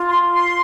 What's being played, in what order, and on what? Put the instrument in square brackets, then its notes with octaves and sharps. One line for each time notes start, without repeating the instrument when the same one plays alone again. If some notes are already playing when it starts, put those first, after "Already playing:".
Already playing: [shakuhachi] F4
[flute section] C6
C6